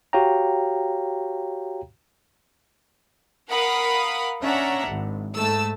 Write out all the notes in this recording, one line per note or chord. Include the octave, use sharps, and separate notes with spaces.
F#4 G4 C#5 F5 G5 A#5
A#4 F5 F#5 B5 D#6
C#4 D4 E5 F#5 A#5
G#1
G#2 A3 A5 E6